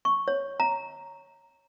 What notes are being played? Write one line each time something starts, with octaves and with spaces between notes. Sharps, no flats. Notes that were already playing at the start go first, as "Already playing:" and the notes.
C#6
C#5
A#5